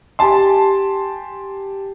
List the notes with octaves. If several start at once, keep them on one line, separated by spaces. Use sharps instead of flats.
G4 G#5 A5 C6